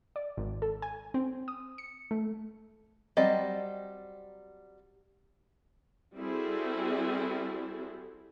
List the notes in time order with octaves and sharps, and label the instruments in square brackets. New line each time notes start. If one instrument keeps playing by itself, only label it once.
[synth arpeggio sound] D5
G#1
A4
G#5
C4
D#6
C#7
A3
[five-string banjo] F#3 G3 C4 D5 D#5
[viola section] G3 C4 E4 F#4 G#4 A4